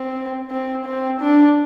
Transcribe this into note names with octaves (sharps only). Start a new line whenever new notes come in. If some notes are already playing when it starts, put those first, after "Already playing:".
Already playing: C4
C4
C4
D4